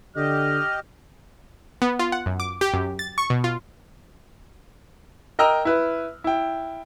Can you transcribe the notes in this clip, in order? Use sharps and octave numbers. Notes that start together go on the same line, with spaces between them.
D3 G4 D#5 F6
B3
F4
F#5
F#2
D6
G4
F#2
A6
C#6
B2
F4
A#4 D#5 G5 A#5 E6 F6
E4 B4
E4 G5